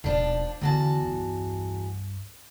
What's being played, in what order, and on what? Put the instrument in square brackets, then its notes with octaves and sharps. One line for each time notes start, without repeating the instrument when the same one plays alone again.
[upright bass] D#1 B1 [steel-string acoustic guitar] F3 D4
[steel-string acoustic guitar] E2 F#4 A5 [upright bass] D3 D#3
[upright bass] C2 G2